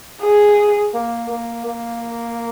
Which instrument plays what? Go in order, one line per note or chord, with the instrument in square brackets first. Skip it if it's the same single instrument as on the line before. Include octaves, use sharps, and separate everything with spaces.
[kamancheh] G#4
[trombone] A#3
A#3
A#3